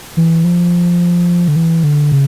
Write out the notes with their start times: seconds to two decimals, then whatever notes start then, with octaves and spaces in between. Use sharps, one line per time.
0.17 E3
0.44 F3
1.48 D3
1.56 E3
1.84 D3
2.12 C#3